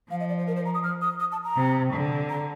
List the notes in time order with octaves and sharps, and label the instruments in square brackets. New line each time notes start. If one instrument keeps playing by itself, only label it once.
[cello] F3 [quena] F5
[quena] D#5
D5
C5
A#4
C5
A#5
D#6
F6
D#6
D#6
A5
A#5
[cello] C3
D3
[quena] A#5